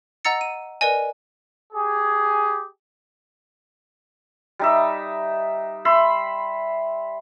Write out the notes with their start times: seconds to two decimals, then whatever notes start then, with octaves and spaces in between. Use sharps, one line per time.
0.25 D#5 F#5 A#5 E6 A6 C#7
0.41 D#7
0.81 A#4 B4 D5 D#5 G#5
1.73 G4 G#4
4.59 G3 D#4 E5
5.85 E5 B5 C6